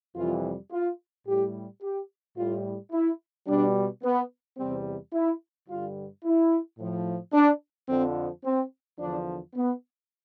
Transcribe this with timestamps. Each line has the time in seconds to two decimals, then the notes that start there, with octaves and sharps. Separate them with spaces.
0.16 F2 C3 E3 G3 F4
0.72 F4
1.26 A2 G3 G4
1.82 G4
2.37 A2 G3 F4
2.92 E4
3.47 B2 G3 D4
4.03 B3
4.57 E2 C3 G3 C4
5.13 E4
5.68 G2 D3 G3 F4
6.24 E4
6.78 A2 F3
7.33 D4
7.88 F2 D3 F3 C4
8.44 C4
8.99 E2 D3 F3 D4
9.55 B3